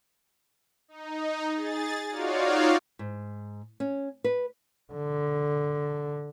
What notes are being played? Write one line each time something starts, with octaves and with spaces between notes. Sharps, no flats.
D#4
G#4 A6
D#4 F4 F#4 C#5 D5 F5
G#2
C#4
B4
D3